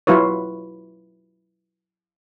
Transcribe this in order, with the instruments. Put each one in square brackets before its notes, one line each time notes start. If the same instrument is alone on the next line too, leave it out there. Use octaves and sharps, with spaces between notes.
[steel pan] F#3 E4 F4 B4 C#5